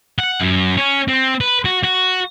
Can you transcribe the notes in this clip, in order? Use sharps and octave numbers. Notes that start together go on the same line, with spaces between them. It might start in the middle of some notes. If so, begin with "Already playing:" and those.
F#5
F#2
C#4
C4
B4
F#4
F#4